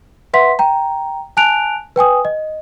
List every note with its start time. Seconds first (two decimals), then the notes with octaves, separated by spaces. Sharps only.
0.33 B4 E5 F#5 C6 B6
0.59 G5 A#5
1.37 G#5 A5 F#6 D7 F7
1.96 B4 G5 G#5 D#6
2.25 D#5